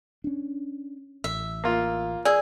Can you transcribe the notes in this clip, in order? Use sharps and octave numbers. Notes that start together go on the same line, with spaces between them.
C#4 D4
A1 E5
A#3 F4
G#4 D5 E6